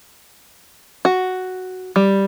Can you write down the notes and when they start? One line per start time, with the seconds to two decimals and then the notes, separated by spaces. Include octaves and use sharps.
1.05 F#4
1.96 G3